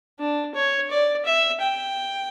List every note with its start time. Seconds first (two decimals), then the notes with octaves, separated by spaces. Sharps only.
0.20 D4
0.55 C#5
0.91 D5
1.26 E5
1.61 G5